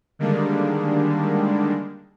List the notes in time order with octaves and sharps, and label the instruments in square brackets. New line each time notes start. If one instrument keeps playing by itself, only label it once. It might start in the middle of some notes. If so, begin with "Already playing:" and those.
[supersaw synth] D3 D#3 G3 G#3 A#3 D4